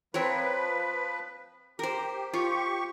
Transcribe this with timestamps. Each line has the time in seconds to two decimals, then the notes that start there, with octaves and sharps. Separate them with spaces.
0.14 F3 C4 A#4 B4 C#5
1.79 G4 A#4 C5
2.34 F4 G4 C#6